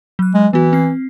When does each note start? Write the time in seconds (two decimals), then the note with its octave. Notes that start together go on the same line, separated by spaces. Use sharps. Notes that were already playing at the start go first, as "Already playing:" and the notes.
0.19 F#3 F#6
0.34 G#3
0.53 E3 B3 F#4
0.73 C4 C7